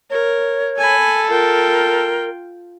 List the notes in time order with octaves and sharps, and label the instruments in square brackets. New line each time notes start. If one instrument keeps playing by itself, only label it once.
[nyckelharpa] A#4 [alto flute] C#5
[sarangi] A4 [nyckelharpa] G#5 B5
[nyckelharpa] F4 G5 [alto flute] A#4